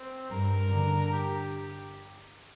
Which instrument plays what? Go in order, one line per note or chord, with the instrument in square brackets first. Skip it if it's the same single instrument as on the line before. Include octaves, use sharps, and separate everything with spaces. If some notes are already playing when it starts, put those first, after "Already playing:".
Already playing: [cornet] C4
[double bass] G2 [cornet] A#4
[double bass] D3
[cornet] G4